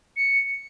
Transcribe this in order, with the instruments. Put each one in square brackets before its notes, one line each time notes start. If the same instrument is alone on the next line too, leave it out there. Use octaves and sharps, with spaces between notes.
[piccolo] C#7